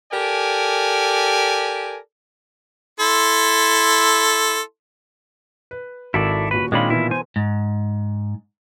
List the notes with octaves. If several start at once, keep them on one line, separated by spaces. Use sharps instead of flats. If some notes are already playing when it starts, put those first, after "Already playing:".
G4 A4 A#4 D5 G#5
E4 A4 C6
B4
G#1 E4 F#4 A4 A#4 D5
D#1 A#2 F#4 B4
A#2 D#3 G#3 C4 D4 F4 C#5 B5
B2 E3 E4
C5 G#5
G#2